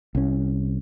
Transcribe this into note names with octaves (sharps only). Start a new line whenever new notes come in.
C2 C#4